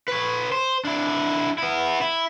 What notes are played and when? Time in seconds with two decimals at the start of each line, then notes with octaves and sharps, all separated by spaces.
0.08 B4 C#5
0.52 C5
0.85 D4 E4
1.58 B3 E4
2.01 E4